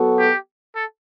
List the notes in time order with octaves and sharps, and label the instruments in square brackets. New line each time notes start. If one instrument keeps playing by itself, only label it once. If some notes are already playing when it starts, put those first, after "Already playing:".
Already playing: [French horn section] F#3 B3 F#4 A4
[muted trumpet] G4
A4